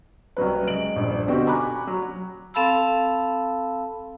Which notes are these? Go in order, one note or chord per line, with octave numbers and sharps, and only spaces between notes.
C2 C#3 F#3 B4
G#3 D7 F#7
D#1 A#1 G2
B2 D3 C4 D#4 F#4 G4
G#5 A#5 B5 C#6 D6 F#6
F#3
C4 A4 F5 A5 B5 E6